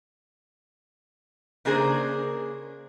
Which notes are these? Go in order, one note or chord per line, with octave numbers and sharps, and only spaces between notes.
C#3 A#3 D4 G#4 A#4 C5